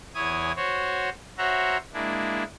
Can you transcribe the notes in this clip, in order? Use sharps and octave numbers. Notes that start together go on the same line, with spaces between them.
E2 E4 C#5 G#5 D#6
F#4 C5 C#5
F#4 C5 C#5 E5 F#5 A#5
G#3 A#3 D4 E4